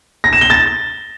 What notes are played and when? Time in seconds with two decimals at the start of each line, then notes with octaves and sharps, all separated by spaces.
0.24 A#6
0.33 E7
0.41 G7
0.50 A6